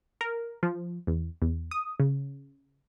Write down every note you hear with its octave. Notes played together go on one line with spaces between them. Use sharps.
A#4
F3
E2
E2
D#6
C#3